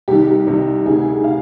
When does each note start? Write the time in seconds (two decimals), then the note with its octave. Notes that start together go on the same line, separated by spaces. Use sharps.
0.08 C2 C3 D#3 G4
0.27 G4
0.47 C2 C3 D#3
0.86 D2 C3 D#3 G#4
1.24 C3 F5